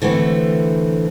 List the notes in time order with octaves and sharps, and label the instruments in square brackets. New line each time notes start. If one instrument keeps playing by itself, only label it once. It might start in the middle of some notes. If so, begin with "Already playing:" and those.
[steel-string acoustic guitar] D3 E3 A3 C4